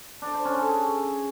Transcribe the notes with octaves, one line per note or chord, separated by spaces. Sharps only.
D4
C5
C#4
A4
G#4